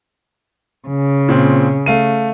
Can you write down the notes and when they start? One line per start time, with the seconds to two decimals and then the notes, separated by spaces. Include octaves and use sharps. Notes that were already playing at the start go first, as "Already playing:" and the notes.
0.88 C#3
1.29 A#2 C4
1.86 A3 F5 D#7